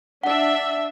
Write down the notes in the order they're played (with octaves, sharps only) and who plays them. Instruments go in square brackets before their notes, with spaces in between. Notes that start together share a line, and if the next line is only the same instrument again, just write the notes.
[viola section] D4 E5 [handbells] F#5